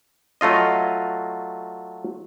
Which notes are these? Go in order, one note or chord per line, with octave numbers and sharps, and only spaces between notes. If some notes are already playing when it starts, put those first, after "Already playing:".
F#3 A3 F4 D#5